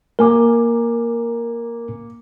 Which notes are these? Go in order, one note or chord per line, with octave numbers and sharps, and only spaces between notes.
A#3 A#4 G#5 D6